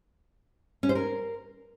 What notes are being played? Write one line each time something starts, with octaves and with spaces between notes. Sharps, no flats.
C#4
C5
A#4